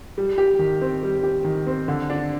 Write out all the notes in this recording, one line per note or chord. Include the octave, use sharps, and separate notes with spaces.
G3
G4
D#3
C4
G3
G4
D#3
C4
D3
D4